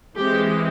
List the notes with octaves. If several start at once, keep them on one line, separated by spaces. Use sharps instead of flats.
E3 G#3 C4 G4